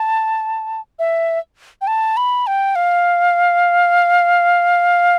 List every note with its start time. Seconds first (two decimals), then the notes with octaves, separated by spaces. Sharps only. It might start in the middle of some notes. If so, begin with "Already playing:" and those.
Already playing: A5
0.99 E5
1.81 G5
1.87 A5
2.17 B5
2.47 G5
2.76 F5